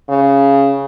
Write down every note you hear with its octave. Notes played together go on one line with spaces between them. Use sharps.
C#3